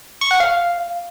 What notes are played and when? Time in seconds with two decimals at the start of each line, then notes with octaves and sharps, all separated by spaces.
0.21 C#6
0.31 F#5
0.40 F5